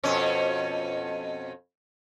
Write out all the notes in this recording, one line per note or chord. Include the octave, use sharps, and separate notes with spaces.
F2 B2 C#4